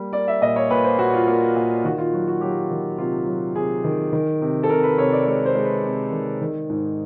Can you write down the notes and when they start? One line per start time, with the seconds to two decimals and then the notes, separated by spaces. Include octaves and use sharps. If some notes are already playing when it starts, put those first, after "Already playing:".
Already playing: G3 A#3
0.13 A#3 D5
0.28 E5
0.42 A#2 D#5
0.56 C#5
0.70 A#2 B4
0.84 C5
0.98 A#2 F#4
1.13 F4
1.27 A#3
1.56 A#2
1.84 D#3 F#4
1.98 F4
2.12 F#3 F#4
2.27 F#4
2.41 F#3 G4
2.70 D#3
2.98 C3 F4
3.26 F#3
3.55 C3 G#4
3.84 D#3
4.12 D#3
4.41 C3
4.63 A4
4.69 C3 A#4
4.83 B4
4.98 C3 C#5
5.12 D5
5.26 G#3 C#5
5.45 C5
5.55 G#3
5.64 B4
5.83 C3
6.12 D#3
6.41 D#3
6.70 G#2